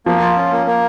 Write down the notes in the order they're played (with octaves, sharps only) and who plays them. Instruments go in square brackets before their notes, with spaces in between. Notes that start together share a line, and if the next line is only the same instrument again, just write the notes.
[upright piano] F3 [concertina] A#3
[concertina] F4
C#4
A#3
A#3